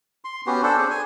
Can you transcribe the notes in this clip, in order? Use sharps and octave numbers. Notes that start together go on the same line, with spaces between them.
C6
B3 C#4 F#4 G4
D4 A4 C5
C4 G#4
G#5